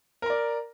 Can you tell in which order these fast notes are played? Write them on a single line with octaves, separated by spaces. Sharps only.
A#4 A#5 D5